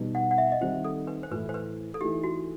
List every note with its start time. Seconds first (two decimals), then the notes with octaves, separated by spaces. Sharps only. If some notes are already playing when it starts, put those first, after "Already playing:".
Already playing: B2 G3 D#4
0.15 F#5
0.31 F#5
0.38 E5
0.52 D#5
0.61 D#3 G3 C4 D#4 C5
0.85 A4
1.07 B4
1.23 C5
1.31 A2 E3 A3 E4 B4
1.49 C5
1.54 B4
1.94 A4
2.01 E3 A3 D#4 G4
2.24 F#4